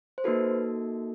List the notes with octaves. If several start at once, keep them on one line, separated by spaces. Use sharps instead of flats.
C5
A#3 D#4 F#4 A4 B4